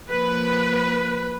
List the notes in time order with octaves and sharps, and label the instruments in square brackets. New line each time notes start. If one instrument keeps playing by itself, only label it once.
[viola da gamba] F3 A#3 [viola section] B4